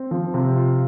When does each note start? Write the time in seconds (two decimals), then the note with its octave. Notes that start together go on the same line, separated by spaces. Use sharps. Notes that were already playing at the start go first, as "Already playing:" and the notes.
Already playing: C4
0.11 F3
0.34 C3
0.56 F4